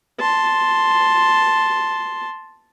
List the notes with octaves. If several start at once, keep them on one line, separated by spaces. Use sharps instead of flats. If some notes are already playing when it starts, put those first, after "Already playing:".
A5 C6